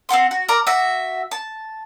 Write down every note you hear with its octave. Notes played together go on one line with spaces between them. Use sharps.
C4 F5 F#5 C6
F#4
A#4 D5 A#5
F#4 E5
A5